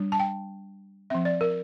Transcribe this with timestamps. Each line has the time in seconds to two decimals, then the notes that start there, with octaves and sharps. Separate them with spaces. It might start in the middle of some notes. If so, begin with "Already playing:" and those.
Already playing: G3 D4
0.12 A5
0.19 G5
1.10 F3 C4 E5
1.25 D5
1.41 A#4